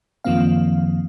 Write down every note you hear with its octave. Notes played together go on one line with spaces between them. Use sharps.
F#2 D#3 F3 A#3 C4 F5